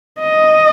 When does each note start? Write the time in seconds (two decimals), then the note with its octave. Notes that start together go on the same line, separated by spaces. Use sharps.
0.20 D#5